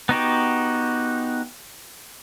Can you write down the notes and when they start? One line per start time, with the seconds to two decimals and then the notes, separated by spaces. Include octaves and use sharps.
0.09 B3 D#4 F#4 G4